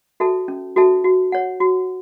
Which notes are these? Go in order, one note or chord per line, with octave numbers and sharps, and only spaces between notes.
F#4 A4 E5 A5
C#4
F#4 A4 E5 A5
F#4
C#5 F#5
F#4